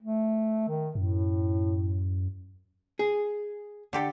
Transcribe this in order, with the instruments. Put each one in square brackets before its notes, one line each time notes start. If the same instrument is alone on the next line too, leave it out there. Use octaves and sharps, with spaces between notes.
[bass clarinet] A3
D#3
[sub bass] F#2 [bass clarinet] A2
[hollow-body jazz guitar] G#4
[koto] D3 G4 A4